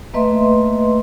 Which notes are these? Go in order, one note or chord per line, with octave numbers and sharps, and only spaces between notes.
A3 A#3 B4 D#5 E5 C6